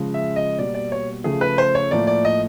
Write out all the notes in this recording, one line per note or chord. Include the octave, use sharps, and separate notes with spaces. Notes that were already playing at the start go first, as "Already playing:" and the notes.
Already playing: C#3 F3 G#3
E5
D#5
B2 G3 A#3 D5
D5
C#5
C#3 F3 A3 G#4
B4
C5
C#5
A2 F3 A#3 D5
D5
D#5